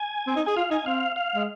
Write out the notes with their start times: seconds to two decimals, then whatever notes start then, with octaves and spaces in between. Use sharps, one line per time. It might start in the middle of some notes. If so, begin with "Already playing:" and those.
Already playing: G#5
0.27 C4
0.36 D#4
0.46 G#4 G#5
0.57 F4 F5
0.71 D#4 G#5
0.86 C4 F5
1.16 F5
1.35 G#3